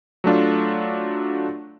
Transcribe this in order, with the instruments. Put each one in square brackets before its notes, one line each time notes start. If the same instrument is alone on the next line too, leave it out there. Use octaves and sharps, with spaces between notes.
[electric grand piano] F#3 A3 D4 F4